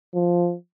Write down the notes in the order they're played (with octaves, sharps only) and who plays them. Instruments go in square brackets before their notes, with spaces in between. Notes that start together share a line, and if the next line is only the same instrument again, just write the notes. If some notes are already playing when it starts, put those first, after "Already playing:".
[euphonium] F3